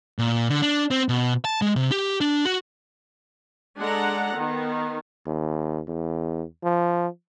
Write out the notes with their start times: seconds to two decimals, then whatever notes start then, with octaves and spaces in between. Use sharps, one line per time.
0.19 A#2
0.50 D3
0.62 D4
0.91 C4
1.09 B2
1.45 A5
1.62 G#3
1.76 C3
1.91 G4
2.21 D4
2.45 F#4
3.78 G#3 D4 A4 F#5 A#5
4.35 D#3 B3
5.26 D#2
5.88 E2
6.64 F3